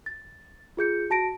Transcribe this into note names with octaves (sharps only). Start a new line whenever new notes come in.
A6
F4 G#4 G6 C#7
F#4 A5 A#6 D7